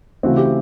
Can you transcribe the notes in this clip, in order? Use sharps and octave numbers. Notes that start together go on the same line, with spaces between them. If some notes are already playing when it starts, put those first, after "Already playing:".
C#3 E3 A3 C4 F#4
G4